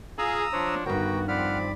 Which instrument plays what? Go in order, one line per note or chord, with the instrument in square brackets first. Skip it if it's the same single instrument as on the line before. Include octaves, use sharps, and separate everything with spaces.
[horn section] F4 G#4 [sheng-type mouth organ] F5 [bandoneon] A#5 D#6 E6
[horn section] F3 D4 [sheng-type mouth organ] C5 C#5
[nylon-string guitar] G2 D#3 [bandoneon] D3 [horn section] B3 F#4 [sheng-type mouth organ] G5 A#5
[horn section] F3 C4 [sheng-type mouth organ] D5 B5 [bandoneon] F#5 F6